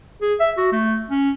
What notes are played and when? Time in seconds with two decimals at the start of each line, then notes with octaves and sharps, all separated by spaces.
0.21 G#4
0.40 E5
0.58 F#4
0.72 A3
1.10 C#4